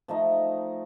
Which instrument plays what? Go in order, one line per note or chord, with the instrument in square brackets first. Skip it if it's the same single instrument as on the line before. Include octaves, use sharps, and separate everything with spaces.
[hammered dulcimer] F3 A3 D#4 D#5